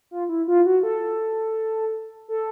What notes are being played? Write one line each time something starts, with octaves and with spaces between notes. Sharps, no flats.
F4
E4
F4
F#4
A4
A4